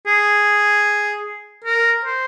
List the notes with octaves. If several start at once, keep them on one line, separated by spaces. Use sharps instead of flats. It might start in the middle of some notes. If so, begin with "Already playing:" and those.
G#4
A#4
C5